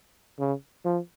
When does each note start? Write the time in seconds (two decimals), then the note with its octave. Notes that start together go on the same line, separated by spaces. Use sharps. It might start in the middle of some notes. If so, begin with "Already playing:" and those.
0.39 C#3
0.85 F3